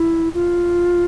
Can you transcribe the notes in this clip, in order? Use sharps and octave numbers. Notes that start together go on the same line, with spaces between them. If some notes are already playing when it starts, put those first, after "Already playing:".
Already playing: E4
F4